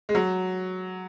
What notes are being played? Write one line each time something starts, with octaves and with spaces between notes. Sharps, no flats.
G#3
F#3